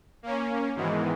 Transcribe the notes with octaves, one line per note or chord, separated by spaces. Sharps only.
A#3 C#4
G#2 B2 D#3 E3 G#3